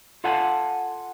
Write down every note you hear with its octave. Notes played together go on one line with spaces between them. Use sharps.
F4 A4 F5 F#5 G#5 A5